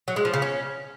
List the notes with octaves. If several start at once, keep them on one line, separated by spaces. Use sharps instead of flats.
F#3
G#3
F3
C#3
C#4